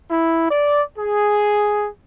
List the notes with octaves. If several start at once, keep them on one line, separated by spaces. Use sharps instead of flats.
E4
D5
G#4